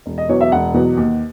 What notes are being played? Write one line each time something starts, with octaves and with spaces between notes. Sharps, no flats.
E1
D#5
E2 B2 F#3 C#5
E5
E1 F#5
E2 B2 F#3
D#2